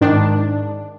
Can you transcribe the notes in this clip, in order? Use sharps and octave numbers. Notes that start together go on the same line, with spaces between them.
G#2 D#3 D4